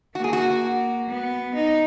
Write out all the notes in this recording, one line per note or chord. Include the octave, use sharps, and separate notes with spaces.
A#3 F#4
G#4
F#4
B3
D#4